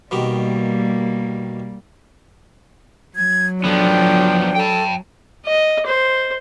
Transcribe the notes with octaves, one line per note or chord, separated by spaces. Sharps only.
B2 D#3 G3 A#3 G4
F#3 G#6
F3 B3 D4 A4 G5
A4 G5 A5
D#5
C5